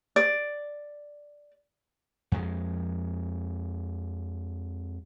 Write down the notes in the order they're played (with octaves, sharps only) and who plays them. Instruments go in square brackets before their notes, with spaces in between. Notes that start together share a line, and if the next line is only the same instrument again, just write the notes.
[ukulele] D5
[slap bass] F2 G#3